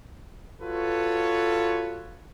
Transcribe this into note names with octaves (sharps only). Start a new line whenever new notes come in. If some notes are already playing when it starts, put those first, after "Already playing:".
F4 F#4 A4 B4 C#5